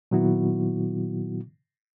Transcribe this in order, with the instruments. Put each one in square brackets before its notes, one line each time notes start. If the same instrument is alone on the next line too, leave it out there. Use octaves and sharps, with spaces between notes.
[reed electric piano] A#2 D#3 F#3 B3 E4 F#4